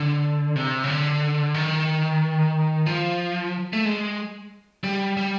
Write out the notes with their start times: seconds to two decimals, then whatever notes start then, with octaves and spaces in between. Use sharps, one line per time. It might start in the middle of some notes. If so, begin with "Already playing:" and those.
Already playing: D3
0.56 C3
0.84 C#3
0.88 D3
1.54 D#3
2.86 F3
3.73 A3
3.85 G#3
4.84 G3
5.17 G3